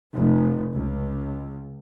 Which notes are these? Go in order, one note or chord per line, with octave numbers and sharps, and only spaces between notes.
F1
C#2